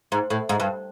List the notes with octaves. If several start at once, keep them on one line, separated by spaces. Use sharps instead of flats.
G#2
A2
G#2
G2